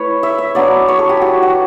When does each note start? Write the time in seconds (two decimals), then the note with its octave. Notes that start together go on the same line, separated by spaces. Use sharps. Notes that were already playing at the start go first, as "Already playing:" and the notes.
Already playing: A3 E4 B4 C#5
0.23 E5
0.38 E5
0.55 F#3 B3 D4 D5
0.88 C#5
0.99 A4
1.09 G4
1.21 F#4
1.42 F#4